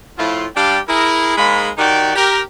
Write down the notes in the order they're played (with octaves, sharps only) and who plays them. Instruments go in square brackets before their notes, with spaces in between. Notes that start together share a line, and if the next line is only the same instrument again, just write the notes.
[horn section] A2 F3 E4 F4
G3 D4 G4 D5 F5 G5
E4 G#4 A#4
G#2 G#3 A#3 B5
D#3 D#4 F#4 G4 D5 G5
G4 A#4